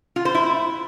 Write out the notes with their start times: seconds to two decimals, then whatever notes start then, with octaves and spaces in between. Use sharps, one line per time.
0.16 F4
0.25 C5
0.35 E4